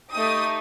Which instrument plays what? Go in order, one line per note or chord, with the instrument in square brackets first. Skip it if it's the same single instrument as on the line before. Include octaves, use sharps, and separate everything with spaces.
[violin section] A3 D#4 G4 D#6